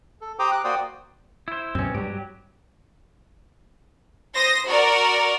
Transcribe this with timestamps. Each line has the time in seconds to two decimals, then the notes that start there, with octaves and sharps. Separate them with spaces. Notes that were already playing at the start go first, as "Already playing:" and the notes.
0.21 A4
0.39 G4 C5 G5 A#5 D6 D#6
0.52 D6 F#6
0.64 A#3 F#4 C5 D5 G5 D#6
1.48 E4 C5
1.75 F#2 B2 C4 C#4
1.95 G2 F#3 G3 G4
4.35 C5 D#6 A#6
4.66 F#4 A#4 D5